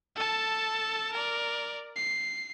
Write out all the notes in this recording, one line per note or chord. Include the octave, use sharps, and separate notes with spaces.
A4 A5
A#4 D5
C7